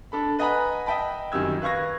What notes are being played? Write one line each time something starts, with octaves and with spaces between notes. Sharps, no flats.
D4 A4 B5
B4 D#5 F#5 G#5 A#5 B5
D#5 E5 G5 A5 B5
F#2 D#3 G3 E6 G#6
B4 F5 C#6 G#6 A#6